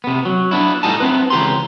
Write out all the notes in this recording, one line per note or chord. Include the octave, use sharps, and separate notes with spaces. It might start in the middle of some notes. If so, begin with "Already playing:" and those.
C3 B3
F#3
B3 D4 E4
A2 G3 D#4 D#5 G#5 A5
B3 C4 E4 B4
C#2 E3 G4 A#5 C6